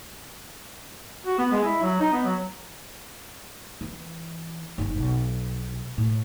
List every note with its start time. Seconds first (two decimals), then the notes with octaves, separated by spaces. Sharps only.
1.26 F#4
1.38 B3
1.52 G#3
1.64 E4
1.82 F#3
2.00 D#4
2.12 B3
2.25 F#3
3.81 E3
4.78 F#1 D#4
4.98 B1
5.98 A2